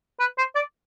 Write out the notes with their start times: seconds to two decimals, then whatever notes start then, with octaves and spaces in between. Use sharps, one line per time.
0.20 B4
0.38 C5
0.55 D5